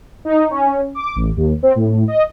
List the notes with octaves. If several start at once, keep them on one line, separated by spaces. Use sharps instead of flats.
D#4
C#4
D6
A1
D#2
C4
A2
D#5